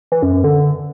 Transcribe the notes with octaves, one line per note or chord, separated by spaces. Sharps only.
E3
F#2
F#2
D3